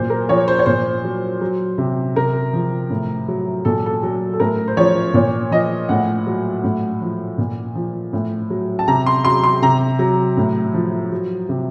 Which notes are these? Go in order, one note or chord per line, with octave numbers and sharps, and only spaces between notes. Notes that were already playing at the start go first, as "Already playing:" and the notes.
Already playing: A#2 F#3 C5
A#4
F3 C#5
C5
C#5
A#2 C5
F#3
F#3
C3
C3 A#4
F3
A2
F#3
A#2 A4
A4
F#3
A4
A2 A#4
C5
F3 C#5
A#2 C#5
F3 D#5
A2 F#5
F#3
A2
F3
A#2
F3
A2
F#3
A5
C3 A#5
C6
F#3 C6
C6
C3 A#5
F#3
A2
F3
F#3
C3